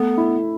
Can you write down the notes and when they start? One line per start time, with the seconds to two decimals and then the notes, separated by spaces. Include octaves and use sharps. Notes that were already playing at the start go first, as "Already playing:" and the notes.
Already playing: A3 B3
0.17 E4